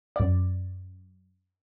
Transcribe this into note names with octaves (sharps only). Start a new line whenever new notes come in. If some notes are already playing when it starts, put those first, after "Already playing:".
F#2 D5